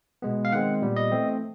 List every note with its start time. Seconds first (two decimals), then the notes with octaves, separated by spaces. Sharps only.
0.22 B2 G#3 B3
0.45 F5
0.52 D#3 G#3 C4 F#5
0.82 A#2 G3 B3
0.96 D#5
1.12 E3 A3 C4